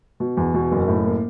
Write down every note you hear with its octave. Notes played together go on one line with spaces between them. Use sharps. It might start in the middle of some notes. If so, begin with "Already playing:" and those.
B2
E2
B2
F#1
A2
A#3